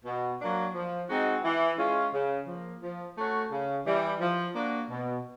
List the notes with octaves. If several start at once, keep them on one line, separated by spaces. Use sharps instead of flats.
B2
F#3 A#3 D4
F3
G#3 C4 D#4 F#4
E3
G#3 C#4 F4
C#3
F3 A#3
F3
A3 C#4 F#4
C#3
E3 G3
F3
A#3 D4 F#4
B2